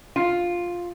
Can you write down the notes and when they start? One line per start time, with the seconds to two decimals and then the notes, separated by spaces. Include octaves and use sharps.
0.16 F4